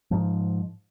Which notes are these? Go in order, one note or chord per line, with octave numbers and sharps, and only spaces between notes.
G#2 F3